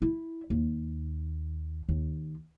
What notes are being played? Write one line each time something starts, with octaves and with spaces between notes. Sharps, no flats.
E4
D#2
D#2